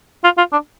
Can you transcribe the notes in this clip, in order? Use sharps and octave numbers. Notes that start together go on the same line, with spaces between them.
F4
F4
D4